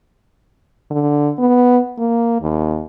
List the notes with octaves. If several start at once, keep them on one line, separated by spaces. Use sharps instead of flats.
D3
B3
A#3
D#2